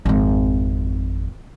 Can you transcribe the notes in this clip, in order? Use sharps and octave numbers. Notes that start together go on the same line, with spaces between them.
G#1 F2